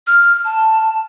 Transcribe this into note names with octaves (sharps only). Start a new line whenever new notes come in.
F6
A5